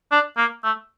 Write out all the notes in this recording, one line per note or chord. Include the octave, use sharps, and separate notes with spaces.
D4
A#3
A3